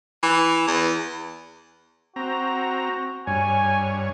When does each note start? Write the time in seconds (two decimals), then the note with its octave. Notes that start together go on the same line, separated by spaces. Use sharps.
0.23 E3
0.67 E2
2.16 C4 F#4 A#5
3.27 G2 C#5 G#5